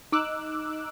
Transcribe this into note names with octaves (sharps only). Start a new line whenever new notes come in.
D#4 D6 E6 F#6